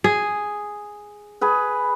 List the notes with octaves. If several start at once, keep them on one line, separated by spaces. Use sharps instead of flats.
G#4
G#4 B4